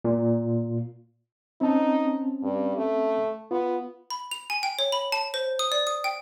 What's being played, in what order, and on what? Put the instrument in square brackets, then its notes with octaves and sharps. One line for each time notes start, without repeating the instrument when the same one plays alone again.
[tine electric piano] A#2
[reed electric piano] C4 C#4 A5 [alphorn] D#4
[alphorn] G2
A3
[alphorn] B3 [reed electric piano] F4
[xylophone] B5
F7
G#5
G5
C#5
B5
A5
C5
D#6
D5
D#6
G5